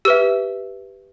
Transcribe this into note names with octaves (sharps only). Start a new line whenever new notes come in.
G4 B4 E5 E6